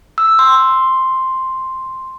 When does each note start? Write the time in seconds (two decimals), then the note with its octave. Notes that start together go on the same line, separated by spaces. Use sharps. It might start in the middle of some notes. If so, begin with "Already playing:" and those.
0.18 E6
0.39 C6